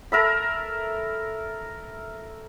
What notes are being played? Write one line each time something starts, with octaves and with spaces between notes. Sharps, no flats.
A4 A#4 E5 B5